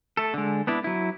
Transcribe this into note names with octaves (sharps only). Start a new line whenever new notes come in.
A3 A4
D3 G#3
B3 D4 E4
F#3 E4